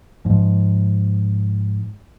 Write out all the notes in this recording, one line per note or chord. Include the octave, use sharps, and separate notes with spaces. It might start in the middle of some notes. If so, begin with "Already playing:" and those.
G#2 F3